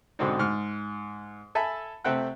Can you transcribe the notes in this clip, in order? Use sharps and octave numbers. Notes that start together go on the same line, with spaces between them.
G#2 B2 D3 C4 D4 D#4
G#2 F6
A4 E5 G#5 A5 B5
C3 A3 C4 F#5 G5 F#6